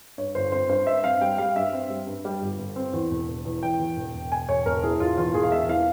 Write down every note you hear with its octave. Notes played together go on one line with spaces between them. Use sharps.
G2 C#5
G1 C5
C4 C5
G2 C5
G2 E5
C4 F5
G3 G5
G3 F5
G2 E5
C4
G3
G2
G3
G1
G1
C4
E2
E1
E1
E2
E2 G5
E2
E1
E1
E1 G#5
E1 C#5
E1 A#4
E3 G#4
E1 F4
E2 F4
E1 G#4
F5
E1 E5
E3 F5